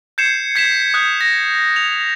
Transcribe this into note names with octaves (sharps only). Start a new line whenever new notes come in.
G6 G#6 C7 C#7 E7
G#6 B6 C#7 E7
D#6 F#6 G6 B6 C7
A#6
F7